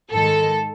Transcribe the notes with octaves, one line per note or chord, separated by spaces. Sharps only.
G#2 D#3 G#3 A4